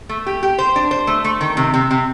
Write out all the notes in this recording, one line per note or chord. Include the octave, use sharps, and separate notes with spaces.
A3
G4
G4
C5
D4
C5
A3
A3
D#3
C3
C3
C3